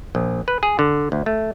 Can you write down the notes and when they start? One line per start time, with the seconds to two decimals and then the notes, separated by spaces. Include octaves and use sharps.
0.15 A#1
0.48 B4
0.63 G#4
0.79 D3
1.12 D2
1.26 A3